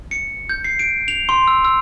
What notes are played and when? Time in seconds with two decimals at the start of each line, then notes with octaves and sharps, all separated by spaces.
0.11 C#7
0.49 G6
0.64 C7
0.79 D7
1.08 F7
1.29 C6
1.48 E6
1.65 E6